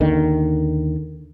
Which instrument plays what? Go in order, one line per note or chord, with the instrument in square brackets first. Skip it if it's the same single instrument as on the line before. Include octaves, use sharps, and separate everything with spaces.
[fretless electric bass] D#2 D3 D#3